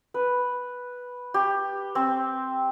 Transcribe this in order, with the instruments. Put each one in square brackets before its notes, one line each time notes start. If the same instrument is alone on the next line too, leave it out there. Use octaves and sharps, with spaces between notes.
[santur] B4
G4
C4